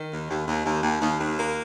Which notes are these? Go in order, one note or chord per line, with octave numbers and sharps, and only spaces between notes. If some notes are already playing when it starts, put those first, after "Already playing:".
Already playing: D#3
D#2
D#2
D#2
D#2
D#2
D#2
D#2
A#3